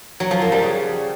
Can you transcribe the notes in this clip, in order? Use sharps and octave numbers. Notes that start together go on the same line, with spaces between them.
F#3
F3
F#2
G3
C#3